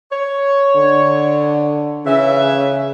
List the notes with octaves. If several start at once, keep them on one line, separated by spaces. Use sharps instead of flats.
C#5
D3
C#3 E3 C#4 E5